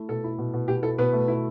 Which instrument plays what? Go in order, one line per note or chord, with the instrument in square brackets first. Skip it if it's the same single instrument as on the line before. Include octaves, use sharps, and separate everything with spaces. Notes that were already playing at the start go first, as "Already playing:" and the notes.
Already playing: [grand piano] A3 E4
[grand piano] B2 [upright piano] A4
[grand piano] E4
B2
B2
[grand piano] B2 [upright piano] G4
[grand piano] E4 [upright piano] A4
[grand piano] B2 [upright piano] B3 B4
[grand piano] A3
E4